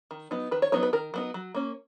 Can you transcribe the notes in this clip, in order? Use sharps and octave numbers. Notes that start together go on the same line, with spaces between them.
D#3
F#3 B3 D#4
D#3 B4
C#5
F#3 B3 D#4 C#5
B4
D#3 A#4
F#3 B3 D#4
F#3
A#3 C#4